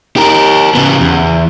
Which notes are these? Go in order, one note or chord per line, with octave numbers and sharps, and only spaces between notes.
G4 A#4
C#3 B3
E2